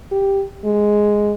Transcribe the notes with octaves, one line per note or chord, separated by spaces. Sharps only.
G4
G#3